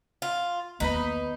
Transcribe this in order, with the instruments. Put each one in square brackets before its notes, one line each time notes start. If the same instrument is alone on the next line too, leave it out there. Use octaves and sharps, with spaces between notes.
[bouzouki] F4
[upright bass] D#2 A#3 [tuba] B3 [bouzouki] D#4 [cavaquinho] B4 A#5 B5